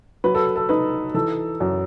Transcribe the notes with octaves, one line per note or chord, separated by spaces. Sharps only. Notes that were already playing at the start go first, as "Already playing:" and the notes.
F#3 B4
A4
A4
D#4 B4
E3 A4
F#2